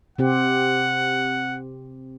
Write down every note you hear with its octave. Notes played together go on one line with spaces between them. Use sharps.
C3 C4 G4 F#5